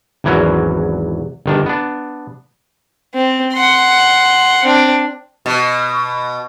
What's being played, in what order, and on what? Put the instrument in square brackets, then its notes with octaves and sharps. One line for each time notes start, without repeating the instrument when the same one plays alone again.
[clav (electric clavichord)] G#1 E2 E3 F#3 C#4
G1 D#3 D4
B3 D4
[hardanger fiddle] C4
F#5 C6
C4 D4
[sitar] B2